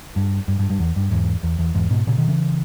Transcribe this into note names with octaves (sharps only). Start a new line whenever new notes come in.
G2
G2
G2
G2
E2
G2
E2 G#2
E2
E2
E2 G#2
G#2 B2
A#2 C#3
B2 D#3
C#3 E3